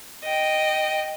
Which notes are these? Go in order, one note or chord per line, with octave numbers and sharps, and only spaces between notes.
D#5 G5